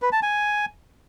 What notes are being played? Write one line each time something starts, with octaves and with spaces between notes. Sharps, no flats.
B4
A5
G#5